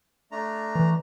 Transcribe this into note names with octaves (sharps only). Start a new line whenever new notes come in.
A3 D4 A#5
E3